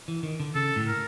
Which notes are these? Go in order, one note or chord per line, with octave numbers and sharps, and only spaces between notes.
E3
D#3
D3
C#3 A4
A2
A#4